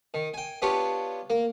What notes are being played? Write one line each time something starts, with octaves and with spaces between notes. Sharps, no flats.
D#3
G5 G#5
B3 D4 F4 G4 C#5
A#3